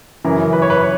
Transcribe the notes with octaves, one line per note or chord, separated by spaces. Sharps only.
F#2 C#3 E3 A#4
B4
C#5
B4
C#5